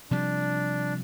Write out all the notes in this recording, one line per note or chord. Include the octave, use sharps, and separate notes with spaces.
C3 F3 G3 D4